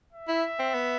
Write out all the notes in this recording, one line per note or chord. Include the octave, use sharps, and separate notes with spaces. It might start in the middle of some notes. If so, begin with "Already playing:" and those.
E5
E4
C4
B3